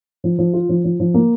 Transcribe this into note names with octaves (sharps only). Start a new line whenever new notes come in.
F3
F3
F4
F3
F3
F3
A#3